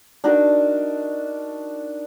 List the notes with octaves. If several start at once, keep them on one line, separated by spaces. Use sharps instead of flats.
D4 D#4 F#4 A#4